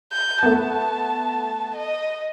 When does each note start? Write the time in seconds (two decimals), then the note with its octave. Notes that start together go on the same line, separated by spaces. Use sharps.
0.13 G6
0.43 A3 B3 A5
1.76 D#5